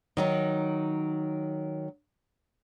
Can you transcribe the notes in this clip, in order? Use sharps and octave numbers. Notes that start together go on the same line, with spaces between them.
D#3 F#3 D#4